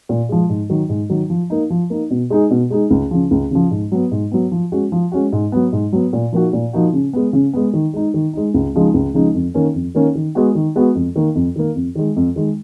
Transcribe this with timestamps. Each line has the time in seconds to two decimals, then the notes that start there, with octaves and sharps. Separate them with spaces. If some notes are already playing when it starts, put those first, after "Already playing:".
0.09 A#2
0.29 F3 G#3
0.49 G#2
0.70 D#3 F#3
0.89 G#2
1.10 D#3 F#3
1.30 F3
1.50 A#3 D#4
1.70 F3
1.90 A#3 D#4
2.10 B2
2.30 G#3 D#4 G#4
2.51 B2
2.70 G#3 D#4 G#4
2.90 C#2
3.11 C#3 F3
3.31 C#2
3.51 C#3 F3
3.71 G#2
3.92 F#3 B3
4.11 G#2
4.31 F#3 B3
4.51 F3
4.72 G#3 C#4 F#4
4.92 F3
5.12 G#3 C#4 F#4
5.32 G#2
5.52 F#3 B3
5.73 G#2
5.93 F#3 B3
6.13 A#2
6.32 F3 A#3 D#4 F#4
6.53 A#2
6.73 F3 A#3 D#4 F#4
6.93 C#3
7.13 G#3 B3
7.33 C#3
7.53 G#3 B3
7.73 D#3
7.93 G#3 D#4
8.14 D#3
8.33 G#3 D#4
8.54 C#2
8.74 C#3 F3 G#3 D#4
8.94 C#2
9.14 C#3 F3 G#3 D#4
9.35 F2
9.54 D#3 A#3 C#4
9.75 F2
9.95 D#3 A#3 C#4
10.15 D#3
10.35 G#3 B3 F#4
10.55 D#3
10.76 G#3 B3 F#4
10.95 F2
11.16 D#3 A#3
11.35 F2
11.56 D#3 A#3
11.75 F2
11.95 D#3 G#3
12.16 F2
12.36 D#3 G#3